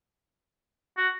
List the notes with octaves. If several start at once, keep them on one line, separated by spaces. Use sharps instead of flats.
F#4